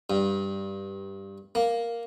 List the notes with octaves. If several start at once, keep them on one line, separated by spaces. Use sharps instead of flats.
G2
A#3